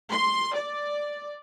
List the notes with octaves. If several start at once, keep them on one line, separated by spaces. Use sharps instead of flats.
C6
D5